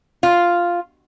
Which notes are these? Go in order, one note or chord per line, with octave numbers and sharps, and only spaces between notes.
F4